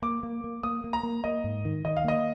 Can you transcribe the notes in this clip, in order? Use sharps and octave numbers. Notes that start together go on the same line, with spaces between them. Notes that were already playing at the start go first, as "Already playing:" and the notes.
A#3 D6
A#3
A#3
A#3 D#6
A#3
A#5
A#3
A#3 D#5
G#2
D#3
D#3 D#5
F5
A#3 D#5